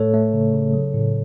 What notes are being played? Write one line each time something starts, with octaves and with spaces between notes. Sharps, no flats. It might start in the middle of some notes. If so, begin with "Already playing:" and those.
Already playing: A2 A3 A4 C#5
A3
C#3
C#3
F#3
A2